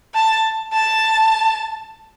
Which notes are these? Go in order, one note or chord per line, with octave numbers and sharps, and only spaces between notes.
A5
A5